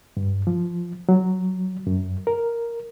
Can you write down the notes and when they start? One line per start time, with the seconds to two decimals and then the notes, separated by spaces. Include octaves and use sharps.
0.17 G2
0.47 F3
1.09 F#3
1.87 F#2
2.27 A#4